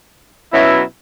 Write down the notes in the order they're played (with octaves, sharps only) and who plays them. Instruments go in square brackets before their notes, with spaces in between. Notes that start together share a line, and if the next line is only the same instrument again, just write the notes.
[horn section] B2 F#3 C#4 E4